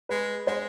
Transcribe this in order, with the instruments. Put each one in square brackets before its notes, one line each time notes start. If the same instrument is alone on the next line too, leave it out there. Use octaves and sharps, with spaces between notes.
[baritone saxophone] G#3 [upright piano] B4
[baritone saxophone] G#3 [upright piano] C5